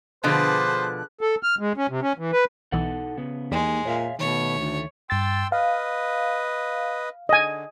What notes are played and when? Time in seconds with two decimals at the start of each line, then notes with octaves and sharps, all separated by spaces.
0.24 B2 D3 F3 G#4 B4 C5 A5 F#6
1.21 A4
1.43 F6
1.59 G#3
1.77 C#4
1.89 C3
2.02 C#4
2.18 E3
2.32 B4
2.72 B1 B2 E3 D#4 A4 F#5
3.17 C#3 B3
3.51 E2 G#3 A#3 D#4 G4
3.85 A#2 C#5 E5 F5
4.19 B2 D#3 A3 C#5
4.58 D2
5.10 G2 G5 C6 E6 A6
5.52 B4 D#5 F5
7.29 D3 D#5 G#5